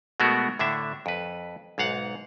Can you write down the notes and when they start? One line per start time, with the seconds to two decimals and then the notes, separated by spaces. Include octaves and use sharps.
0.20 B2 G#3 A3 B3 F#4 A#4
0.59 A2 D3 D4 E5
1.06 F2 B4
1.78 B1 G#2 F5 F#5